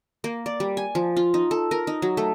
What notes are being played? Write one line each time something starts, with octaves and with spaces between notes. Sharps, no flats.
A#3
D5
G3
G#5
F3
F4
D#4
A4
A#4
D#4
F#3
A3